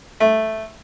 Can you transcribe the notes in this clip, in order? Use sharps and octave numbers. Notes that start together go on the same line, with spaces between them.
A3